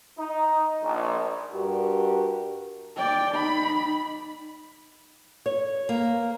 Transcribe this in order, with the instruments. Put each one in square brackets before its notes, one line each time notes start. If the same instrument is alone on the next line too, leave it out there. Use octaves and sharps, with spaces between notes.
[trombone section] D#4
A#1
[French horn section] G2 F#4 G4 A#4
[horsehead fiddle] D5 G5
D#4 B5
[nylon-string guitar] C#5
A#3